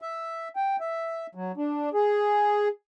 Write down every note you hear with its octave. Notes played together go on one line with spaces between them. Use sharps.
E5
G5
E5
F#3
D4
G#4